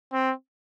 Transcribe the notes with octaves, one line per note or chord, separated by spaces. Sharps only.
C4